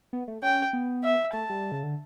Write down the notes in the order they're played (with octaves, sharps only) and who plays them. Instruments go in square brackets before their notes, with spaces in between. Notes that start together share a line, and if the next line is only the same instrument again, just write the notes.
[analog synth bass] B3
A3
[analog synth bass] C#4 [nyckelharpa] G5
[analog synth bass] B3
[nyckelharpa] E5
[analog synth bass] A3 [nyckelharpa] A5
[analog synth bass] G3
C#3
D3